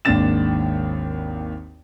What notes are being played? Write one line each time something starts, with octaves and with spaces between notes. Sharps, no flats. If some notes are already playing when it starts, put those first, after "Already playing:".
G#1 D#2 G#2 D4 A6 E7